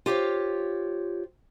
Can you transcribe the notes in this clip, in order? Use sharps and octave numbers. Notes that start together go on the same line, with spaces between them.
F4 G4 C5 C#5